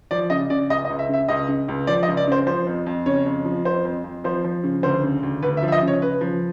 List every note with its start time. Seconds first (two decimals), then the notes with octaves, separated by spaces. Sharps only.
0.11 F3 D5
0.30 C#3 D#5
0.50 C#3 D5
0.70 C#2 D#5
0.85 D#5
0.90 C#2
0.99 E5
1.09 C#3 E5
1.29 C#2 D#5
1.48 C#3
1.68 C#2
1.87 F3 D5
2.03 D#5
2.08 C#2
2.17 D5
2.28 C#3 C5
2.46 F3 C5
2.67 F2
2.86 F2
3.06 C#3 C#5
3.26 F2
3.45 F3
3.65 F2 C5
3.85 F2
4.04 F2
4.24 F3 C5
4.44 F3
4.64 C#3
4.83 D2 C5
5.03 C#3
5.23 D2
5.42 D2 B4
5.57 E5
5.63 F3
5.68 E5
5.72 D#5
5.82 C#3
5.88 C#5
6.02 C#3 B4
6.21 F3